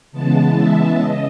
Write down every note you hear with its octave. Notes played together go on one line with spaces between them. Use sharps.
C#3 E3 G#3 B3 A5
E5
C#3 D#5